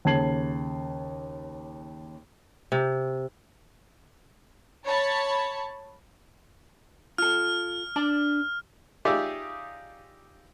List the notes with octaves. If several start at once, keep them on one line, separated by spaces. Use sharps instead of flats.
D#2 C#3 A5 G#6 C7 F#7
C3
C#5 A5 B5
F4 A4 F6
D4 D5 A5
D#4 F4 G4 G#4 D5 E5